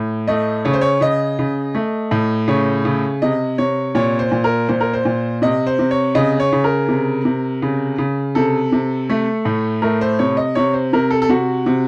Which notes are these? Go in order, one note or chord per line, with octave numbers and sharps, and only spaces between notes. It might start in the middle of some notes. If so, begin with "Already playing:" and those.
Already playing: A2
A3 D#5
C#3 C#5
C5
C#5
C#3 D#5
C#3
A3
A2
C#3 C#5
C#3
C3 D#5
C3 C#5
A#2 C#5
C5
A#2
A#4
A#2 C5
A#4
C5
A#2
C3 D#5
C5
C3
C#5
C#3 D#5
C#5
C#3
A#4
C3
C3
C#3
C#3
C3 A4
C3
A3
A2
A3 A#4
C5
C3 C#5
D#5
C3 C#5
C5
C3 A#4
A4
A4
C3 F#4
C3